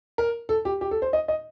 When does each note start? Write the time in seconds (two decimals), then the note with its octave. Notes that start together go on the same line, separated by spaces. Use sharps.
0.18 A#4
0.49 A4
0.65 G4
0.81 G4
0.91 A4
1.02 C5
1.13 D#5
1.28 D#5